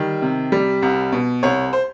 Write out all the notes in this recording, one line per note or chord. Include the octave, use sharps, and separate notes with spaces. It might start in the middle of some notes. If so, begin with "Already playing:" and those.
Already playing: D#3 G3
C3
G3
C2
B2
C2 C#5
C5